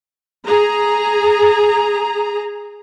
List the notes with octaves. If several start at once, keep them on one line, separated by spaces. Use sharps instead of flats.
G#4 A#5